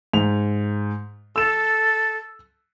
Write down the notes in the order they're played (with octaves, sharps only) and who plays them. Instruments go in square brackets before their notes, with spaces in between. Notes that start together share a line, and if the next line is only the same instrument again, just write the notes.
[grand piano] G#2 F7
[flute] A4 [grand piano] E6 E7